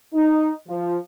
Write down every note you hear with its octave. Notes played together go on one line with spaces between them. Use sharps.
D#4
F3